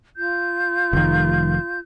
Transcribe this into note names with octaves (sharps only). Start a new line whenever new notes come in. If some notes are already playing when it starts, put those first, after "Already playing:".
F4 G6
F1 D#3